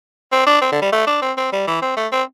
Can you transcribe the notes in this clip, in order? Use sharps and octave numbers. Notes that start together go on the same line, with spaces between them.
C4
D4
C4
D3
G3
A3
D4
C4
C4
G3
E3
C4
A3
C4